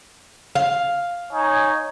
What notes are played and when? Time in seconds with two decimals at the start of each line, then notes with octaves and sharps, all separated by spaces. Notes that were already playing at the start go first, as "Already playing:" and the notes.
0.55 F5
1.33 D#4 C#5 G#5